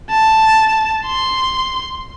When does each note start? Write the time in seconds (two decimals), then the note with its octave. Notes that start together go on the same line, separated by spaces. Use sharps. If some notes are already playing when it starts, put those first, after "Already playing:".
0.11 A5
1.05 C6